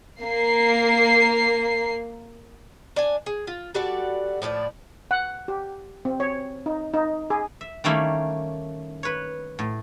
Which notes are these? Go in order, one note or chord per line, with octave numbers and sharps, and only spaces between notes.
A#3 C7
D4 G#5
G#4
F4
G3 F#4 A4 D5
A2 F3 G#4 D5
F#5
G4
C4
C#5
D#4
D#4
G#4
E5
D#3 G3 A3 A#3 C#4 E4
B4 C#5
A2